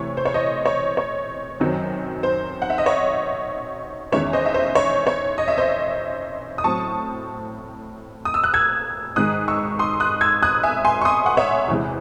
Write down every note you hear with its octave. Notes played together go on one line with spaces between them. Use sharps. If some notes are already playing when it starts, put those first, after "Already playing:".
Already playing: C3 E3 A3 C#5
C5
C#5
C5 D#5
C#5
C#5
F#2 D#3 F#3 C4
C5
F#5
E5
D#5
C#5
E2 D#3 G#3 C#4 C#5 E5
C5 D#5
E5
C5 D#5
C#5
C#5
D#5
E5
C5 D#5
D#6
A2 F#3 C4 A5 C#6
D#6
E6
F#6
E6 G#6
G#2 D#3 G#3 D#6 F#6
C#6 E6
C6 D#6
D#6 F#6
E6 G#6
D#6 F#6
E5 G#5
G#5 C6
C#6
C6 D#6
F#5
C#5 E5
E2 C3 E3 G#3